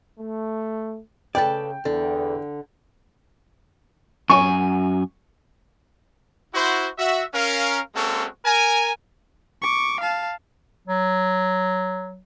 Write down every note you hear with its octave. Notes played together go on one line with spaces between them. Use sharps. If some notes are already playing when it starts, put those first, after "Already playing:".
A3
C#3 A4 B4 D5 G5
E2 D3 A4
F#2 G#5 C#6
E4 F#4 C5
F#4 E5
C#4 A#4 F5
G#3 A#3 C4 C#4 F#4 A4
A#4 G#5
C#6 D6
F5 A5
F#3